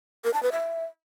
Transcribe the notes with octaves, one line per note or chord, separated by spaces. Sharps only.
A#4
A5
B4
E5